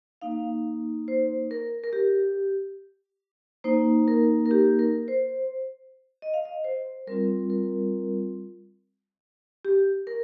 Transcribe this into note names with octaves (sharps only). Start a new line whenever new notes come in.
A#3 D#4 F5
C5
A#4
A#4
G4
A#3 D#4 C5
A#4
A#4
G4
A#4
C5
D#5
F5
D#5
C5
G3 C4 F4 A#4
A#4
G4
A#4